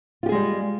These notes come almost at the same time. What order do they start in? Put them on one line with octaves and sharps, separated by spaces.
F4 G4 G#4 G#3 G3